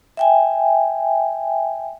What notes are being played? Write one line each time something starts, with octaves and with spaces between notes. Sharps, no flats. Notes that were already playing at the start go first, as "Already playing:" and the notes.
E5 G5 G#5